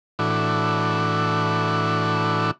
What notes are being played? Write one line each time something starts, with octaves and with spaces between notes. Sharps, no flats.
A2 E3 D4 F#4